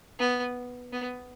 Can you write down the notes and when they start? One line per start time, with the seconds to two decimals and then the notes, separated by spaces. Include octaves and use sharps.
0.19 B3
0.92 B3